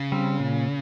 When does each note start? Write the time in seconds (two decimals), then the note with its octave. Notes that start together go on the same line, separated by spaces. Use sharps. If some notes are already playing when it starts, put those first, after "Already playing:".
Already playing: C#3
0.12 G3 C4
0.40 A#2